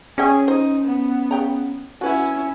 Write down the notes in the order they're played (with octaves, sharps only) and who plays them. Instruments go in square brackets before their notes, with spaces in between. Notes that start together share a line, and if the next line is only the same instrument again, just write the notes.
[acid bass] C#4 [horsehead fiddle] G#4 [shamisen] D5 E5 G5
[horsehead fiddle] D#4 [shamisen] C5
[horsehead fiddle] B3
[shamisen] C#3 G5 A#5
[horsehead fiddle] C#4 E4 [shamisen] F#4 B4 F#5